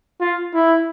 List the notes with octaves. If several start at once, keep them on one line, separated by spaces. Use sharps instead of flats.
F4
E4